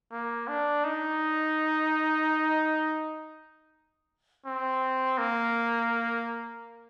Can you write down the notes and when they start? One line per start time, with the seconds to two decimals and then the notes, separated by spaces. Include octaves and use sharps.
0.12 A#3
0.48 D4
0.85 D#4
4.46 C4
5.18 A#3